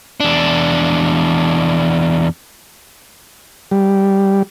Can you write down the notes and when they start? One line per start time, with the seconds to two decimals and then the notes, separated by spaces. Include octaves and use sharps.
0.20 E2 D4
3.71 G3